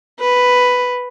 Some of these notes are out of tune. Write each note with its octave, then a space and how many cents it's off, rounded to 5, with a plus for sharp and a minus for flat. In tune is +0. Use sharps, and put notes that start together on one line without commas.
B4 +5